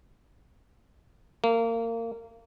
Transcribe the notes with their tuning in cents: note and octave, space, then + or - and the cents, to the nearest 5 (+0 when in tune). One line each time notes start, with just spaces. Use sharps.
A#3 -25